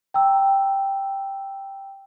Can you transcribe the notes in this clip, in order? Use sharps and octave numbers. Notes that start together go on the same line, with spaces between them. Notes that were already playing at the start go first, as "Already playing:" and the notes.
G5 A#5 E6